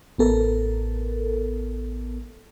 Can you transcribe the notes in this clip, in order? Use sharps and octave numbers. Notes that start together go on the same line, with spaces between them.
A1 B3 A4 A#4